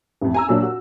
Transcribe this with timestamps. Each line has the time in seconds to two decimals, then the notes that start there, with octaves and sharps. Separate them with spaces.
0.21 A1 F2
0.34 G#5 A#5 E6
0.49 A#2 F#3 D4
0.63 F#4